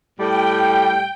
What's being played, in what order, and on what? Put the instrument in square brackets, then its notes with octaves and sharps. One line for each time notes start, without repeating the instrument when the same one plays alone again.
[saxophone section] A2 G3 [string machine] G5